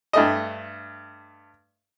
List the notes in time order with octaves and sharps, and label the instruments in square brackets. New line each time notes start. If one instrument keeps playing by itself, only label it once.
[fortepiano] G2 A3 D#5